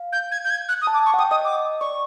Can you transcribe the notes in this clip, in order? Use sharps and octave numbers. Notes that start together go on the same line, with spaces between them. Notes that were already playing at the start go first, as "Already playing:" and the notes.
Already playing: F5
G6
G#6
G6
G#6
F#6
D#6
A5
D6
C#6
F#5
G5 D#6
D#5 D#6
D6
D5 C#6